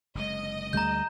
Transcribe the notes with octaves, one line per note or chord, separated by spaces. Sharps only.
F#1 C3 G#3 D#5
D2 G3 A3 A#5 G6